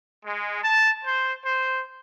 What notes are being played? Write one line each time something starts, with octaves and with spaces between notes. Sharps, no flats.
G#3
A5
C5
C5